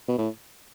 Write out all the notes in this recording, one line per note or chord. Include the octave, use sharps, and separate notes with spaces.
B2
A2